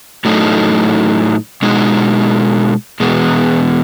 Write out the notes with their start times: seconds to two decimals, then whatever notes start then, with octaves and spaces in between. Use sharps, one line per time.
0.25 A2 F#3 A3 D#4
1.62 B2 G#3 D#4 F#4
3.00 E2 B2 G#3 B3